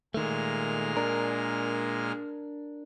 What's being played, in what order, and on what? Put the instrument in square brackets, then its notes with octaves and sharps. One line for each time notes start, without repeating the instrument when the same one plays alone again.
[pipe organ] A#2 G#3 F6 [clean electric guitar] D#3 A3
[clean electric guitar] D4 A#4